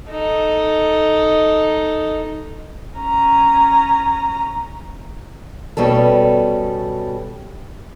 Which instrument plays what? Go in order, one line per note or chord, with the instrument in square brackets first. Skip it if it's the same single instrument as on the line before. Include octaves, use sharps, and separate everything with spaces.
[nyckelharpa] D#4 A4
[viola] C#4 A#5
[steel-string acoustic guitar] B2 G3 C#4 A4